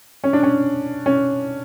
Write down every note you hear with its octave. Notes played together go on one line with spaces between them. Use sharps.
C#4
D4
C#4
C#4